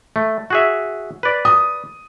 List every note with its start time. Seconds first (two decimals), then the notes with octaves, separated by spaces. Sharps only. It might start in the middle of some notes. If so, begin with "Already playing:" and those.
0.16 A3
0.50 F#4 G#4 E5
1.23 B4 D5
1.45 D#6